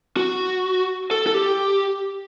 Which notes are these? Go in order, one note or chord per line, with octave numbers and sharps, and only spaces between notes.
F#4
A4
A4
G4